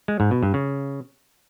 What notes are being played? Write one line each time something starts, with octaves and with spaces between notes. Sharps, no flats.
G#3
G#2
B2
G2
C#3